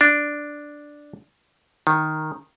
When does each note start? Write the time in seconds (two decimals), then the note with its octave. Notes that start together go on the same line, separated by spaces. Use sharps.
0.01 D4
1.87 D#3